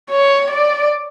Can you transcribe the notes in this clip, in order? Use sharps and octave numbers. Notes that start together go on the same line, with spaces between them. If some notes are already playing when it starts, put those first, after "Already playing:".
C#5
D5